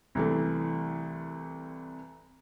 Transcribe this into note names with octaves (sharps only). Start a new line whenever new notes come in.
C2 E3 A3